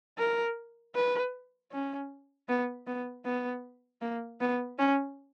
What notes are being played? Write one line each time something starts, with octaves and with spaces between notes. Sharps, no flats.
A#4
B4
C#4
B3
B3
B3
A#3
B3
C#4